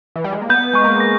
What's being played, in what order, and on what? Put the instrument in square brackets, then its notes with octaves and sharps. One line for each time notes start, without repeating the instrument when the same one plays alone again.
[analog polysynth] E3
G3
G#3
A#3
[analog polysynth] B3 [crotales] G6
[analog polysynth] G#3 [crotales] C#6
[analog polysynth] A#3
[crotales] A#6